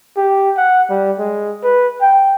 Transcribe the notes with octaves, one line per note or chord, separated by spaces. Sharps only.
G4
F#5
G3
G#3
B4
G5